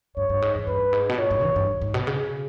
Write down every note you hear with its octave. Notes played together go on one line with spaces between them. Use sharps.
G2 C#5
G2
G#2
E2
G2 B4
G#2
B2
A#2 C#5
G#2
E3
G2
G#2
B2
C#3